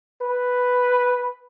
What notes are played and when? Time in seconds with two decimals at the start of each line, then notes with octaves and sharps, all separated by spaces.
0.21 B4